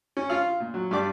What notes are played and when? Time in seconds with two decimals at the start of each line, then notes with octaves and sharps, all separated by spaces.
0.17 C#4
0.30 F4 F5
0.60 A#2
0.74 F#3
0.91 G2 G4 D5 D6